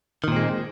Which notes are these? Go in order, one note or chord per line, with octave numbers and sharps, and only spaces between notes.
A#2 D#3 G#3 C4